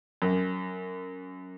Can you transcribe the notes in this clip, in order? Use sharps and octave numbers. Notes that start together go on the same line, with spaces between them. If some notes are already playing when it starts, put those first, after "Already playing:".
F#2